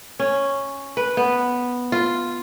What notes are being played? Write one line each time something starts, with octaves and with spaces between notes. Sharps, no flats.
C#4
B4
B3
F4